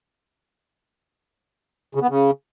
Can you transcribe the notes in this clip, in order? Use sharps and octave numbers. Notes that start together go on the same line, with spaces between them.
C#3
B3
C#3